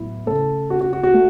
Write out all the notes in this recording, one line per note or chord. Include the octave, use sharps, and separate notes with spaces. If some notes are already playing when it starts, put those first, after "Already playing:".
Already playing: A2 F#3 B3 E4
C#3 A3 A4
F#4
F#4
F#4
F#4
A3